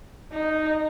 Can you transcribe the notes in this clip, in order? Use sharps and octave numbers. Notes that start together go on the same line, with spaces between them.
D#4